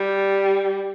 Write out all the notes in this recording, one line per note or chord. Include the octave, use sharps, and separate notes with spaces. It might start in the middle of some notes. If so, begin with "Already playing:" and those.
Already playing: G3